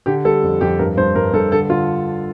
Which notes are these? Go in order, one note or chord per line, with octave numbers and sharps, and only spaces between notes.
D3 G4
G3 A4
F2
F2 G4
G2 A#4
G2 C5
G2 A#4
G2 A4
D3 A4
D3 F4